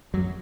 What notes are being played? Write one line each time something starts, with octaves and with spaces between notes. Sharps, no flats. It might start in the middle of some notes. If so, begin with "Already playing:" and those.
F#2 F#3